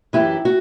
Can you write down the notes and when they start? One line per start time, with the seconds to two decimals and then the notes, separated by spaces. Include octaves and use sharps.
0.13 F#2 E3 E4 G4
0.45 F#4